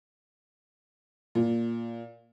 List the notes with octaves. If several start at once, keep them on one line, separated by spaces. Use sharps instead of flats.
A#2